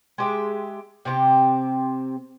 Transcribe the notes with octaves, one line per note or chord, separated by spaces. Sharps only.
G#3 G4 E5
C3 C4 F#4 G4